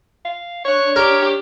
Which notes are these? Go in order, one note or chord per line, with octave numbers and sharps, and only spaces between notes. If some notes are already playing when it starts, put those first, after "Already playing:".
F5
D4 C#5 C#6 F#6
G4 A#4